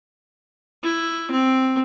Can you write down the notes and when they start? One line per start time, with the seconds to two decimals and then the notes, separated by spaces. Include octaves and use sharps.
0.83 E4
1.31 C4